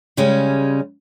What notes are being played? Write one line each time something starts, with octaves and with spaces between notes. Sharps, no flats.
C#3 G3 G#3 C#4